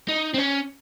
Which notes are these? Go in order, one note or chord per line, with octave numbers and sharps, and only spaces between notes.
D#4
C4
C#4